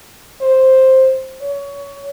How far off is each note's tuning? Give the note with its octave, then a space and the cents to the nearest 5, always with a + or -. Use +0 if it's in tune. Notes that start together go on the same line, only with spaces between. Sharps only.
C5 +5
C#5 +25